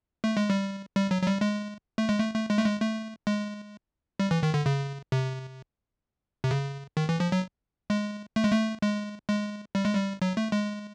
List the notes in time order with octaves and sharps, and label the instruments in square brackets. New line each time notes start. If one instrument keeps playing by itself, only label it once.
[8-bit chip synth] A3
G#3
G3
G3
F#3
F#3
G3
G#3
A3
G#3
A3
A3
G#3
A3
G#3
A3
G#3
G3
E3
D#3
D3
C#3
C3
C3
C#3
D#3
E3
F3
F#3
G#3
A3
G#3
A3
G#3
G#3
G3
G#3
G3
F#3
A3
G#3